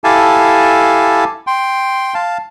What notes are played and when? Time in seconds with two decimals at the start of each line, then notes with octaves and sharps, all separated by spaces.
0.04 E4 G4 A4 F5 G#5 A5
1.47 G5 C6
2.14 F5 A5